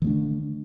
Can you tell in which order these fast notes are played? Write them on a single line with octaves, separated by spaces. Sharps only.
D#3 A3 D4 D3